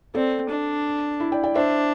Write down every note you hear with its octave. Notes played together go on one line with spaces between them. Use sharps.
C4 A4 D5
D4
E4
D5 G5
D5 G5
D4 C5 E5